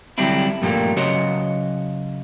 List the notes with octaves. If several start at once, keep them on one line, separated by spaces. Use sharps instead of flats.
D3 F#3 G3 C4 D4 E4
G2 A#2 F3 G3 A3 A#3
C#3 F#3 F#4 C5 C#5 D#5